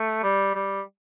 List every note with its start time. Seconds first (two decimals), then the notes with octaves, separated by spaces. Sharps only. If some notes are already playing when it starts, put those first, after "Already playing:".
Already playing: A3
0.23 G3
0.55 G3